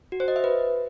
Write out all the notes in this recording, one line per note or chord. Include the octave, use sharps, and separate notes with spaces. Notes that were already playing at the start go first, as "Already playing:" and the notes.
F#4
C5
D#5
E5
B4